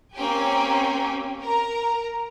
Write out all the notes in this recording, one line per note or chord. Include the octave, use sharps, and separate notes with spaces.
A#3 C4 C#4 G4 G5 G#5
A#4 A#5